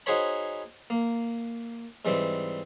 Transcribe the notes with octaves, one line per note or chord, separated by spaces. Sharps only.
D#4 F#4 G#4 C5 C#5 B5
A#3
G#2 E3 G3 C4